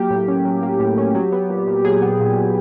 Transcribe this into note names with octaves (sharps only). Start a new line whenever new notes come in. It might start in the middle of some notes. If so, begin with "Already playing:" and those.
Already playing: F#3 A#3 G4
A2
C#4
F#3
A#3
A2
C#4
F#3
B3
A#2
A#2
F#3 G#4
B3
A#2
A#2